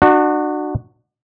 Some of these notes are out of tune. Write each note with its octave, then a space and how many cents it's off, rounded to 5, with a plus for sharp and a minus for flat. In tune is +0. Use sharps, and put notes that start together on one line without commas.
D4 +35 F#4 -5